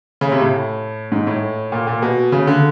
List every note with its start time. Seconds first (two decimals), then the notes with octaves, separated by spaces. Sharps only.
0.21 C#3
0.32 C3
0.41 A2
1.12 G#2
1.27 A2
1.72 A#2
1.87 A#2
2.02 B2
2.32 C#3
2.47 D3